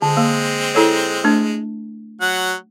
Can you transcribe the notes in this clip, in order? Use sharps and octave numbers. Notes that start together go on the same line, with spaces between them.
D3 G#3 C4
A#3
E4 A4 C#5
A3 D4
F#3 F#5